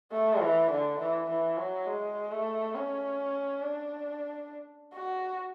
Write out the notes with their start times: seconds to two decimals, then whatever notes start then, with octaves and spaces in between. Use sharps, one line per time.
0.12 A3
0.41 E3
0.71 D3
1.00 E3
1.30 E3
1.58 F#3
1.87 G#3
2.31 A3
2.75 C#4
3.62 D4
4.93 F#4